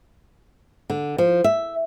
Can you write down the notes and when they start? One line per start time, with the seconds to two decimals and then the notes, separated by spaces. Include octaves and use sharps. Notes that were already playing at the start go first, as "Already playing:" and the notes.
0.90 D3
1.18 F3
1.44 E5